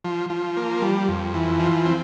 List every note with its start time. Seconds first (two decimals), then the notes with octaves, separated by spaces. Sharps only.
0.04 F3
0.30 F3
0.57 A#3
0.82 G3
1.09 F2
1.34 E3
1.60 F3
1.86 C4